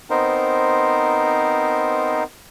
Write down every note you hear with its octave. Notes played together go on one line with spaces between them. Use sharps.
B3 C4 D#4 A#4 C5